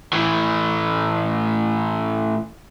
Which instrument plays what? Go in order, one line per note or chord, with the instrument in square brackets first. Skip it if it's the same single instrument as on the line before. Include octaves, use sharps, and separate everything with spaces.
[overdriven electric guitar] A2 E3